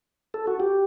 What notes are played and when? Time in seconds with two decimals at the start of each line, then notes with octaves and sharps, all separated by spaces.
0.34 A4
0.47 F#4
0.60 G4